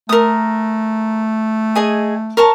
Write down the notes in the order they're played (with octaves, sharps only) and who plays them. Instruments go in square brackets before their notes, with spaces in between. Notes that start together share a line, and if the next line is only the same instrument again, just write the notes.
[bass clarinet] A3 [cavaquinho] A#4 D#6
[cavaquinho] G#4 D#5 G#5
A#4 C#5 A5